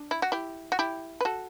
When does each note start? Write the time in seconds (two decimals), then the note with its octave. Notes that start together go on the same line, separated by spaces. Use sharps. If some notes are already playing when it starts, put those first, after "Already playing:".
Already playing: D4
0.11 E4
0.22 F#4
0.32 E4 G4
0.72 F#4
0.79 E4 G4
1.21 B4
1.25 F#4 A4